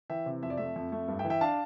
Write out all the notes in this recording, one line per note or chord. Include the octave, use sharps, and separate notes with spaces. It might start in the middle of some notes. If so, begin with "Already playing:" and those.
E3 E5 G5
C3
F2 E5
D5
A3 E5
F2
A3
G2
E5 G5
E3
E5 G5
D4 F5 A5